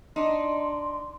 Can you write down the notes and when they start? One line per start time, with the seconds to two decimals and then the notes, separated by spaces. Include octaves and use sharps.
0.16 D4 D#4 C6